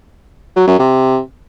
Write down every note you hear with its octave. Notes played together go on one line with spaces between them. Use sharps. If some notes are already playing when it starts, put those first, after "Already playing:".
F#3
F#2
C3